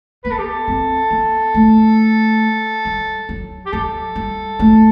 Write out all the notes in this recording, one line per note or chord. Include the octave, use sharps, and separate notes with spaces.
B3 B4
A4
G4
A4
C4
B3
A3
G3
F#3
G4
F#3 A4
G3
A3